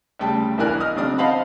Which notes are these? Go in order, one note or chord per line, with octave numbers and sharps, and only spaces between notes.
D2 C#3 G3 G5 A5
B1 E3 D4 A#4 G#5 F#6
D#5 D#6 F6
C#3 F#3 C4 D4 D#6
C5 D#5 F5 F#5 A5 B5